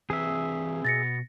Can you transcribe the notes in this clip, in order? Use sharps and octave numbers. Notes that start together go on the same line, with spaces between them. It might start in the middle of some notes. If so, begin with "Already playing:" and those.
E3 C4 G#4 B4 E5
B2 A6 A#6 C#7